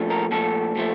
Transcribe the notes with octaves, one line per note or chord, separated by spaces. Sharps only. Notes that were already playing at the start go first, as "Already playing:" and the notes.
Already playing: A#2 F3 A3
A#4
A#2 F3 A3 A4
A#2 F3 A3